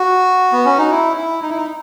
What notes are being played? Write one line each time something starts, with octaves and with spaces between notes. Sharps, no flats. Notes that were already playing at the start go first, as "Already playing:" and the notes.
Already playing: F#4
B3
C#4
D#4
E4
E4
D#4
E4
D#4